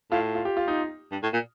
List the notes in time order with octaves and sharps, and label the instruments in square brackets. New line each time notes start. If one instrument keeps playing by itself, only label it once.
[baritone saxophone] A2 [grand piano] F4
[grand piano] F4
G4
F4
D#4
[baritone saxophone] G2
A2
A#2